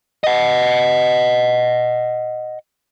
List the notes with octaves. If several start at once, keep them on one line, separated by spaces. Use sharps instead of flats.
D#5 F#5